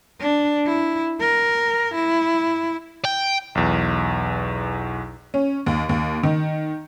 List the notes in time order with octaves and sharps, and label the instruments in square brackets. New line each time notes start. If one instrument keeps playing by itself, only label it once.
[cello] D4
E4
A#4
E4
[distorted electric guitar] G5
[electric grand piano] B1 E2
[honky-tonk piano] C#4
D#2
D#2
D#3